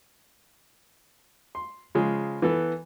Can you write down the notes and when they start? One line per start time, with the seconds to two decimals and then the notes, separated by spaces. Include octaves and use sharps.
1.55 C6
1.95 C#3 F3 G#3
2.42 E3 B3 A4